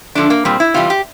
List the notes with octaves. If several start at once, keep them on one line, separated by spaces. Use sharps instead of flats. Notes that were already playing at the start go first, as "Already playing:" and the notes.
D3 F3 A3 D4
A#3
A#2 G3 C4
E4
C3 E3 G3 F4
G4